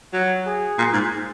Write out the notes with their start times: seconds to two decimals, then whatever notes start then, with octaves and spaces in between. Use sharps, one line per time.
0.13 F#3
0.46 G#4
0.78 A#2
0.93 G#2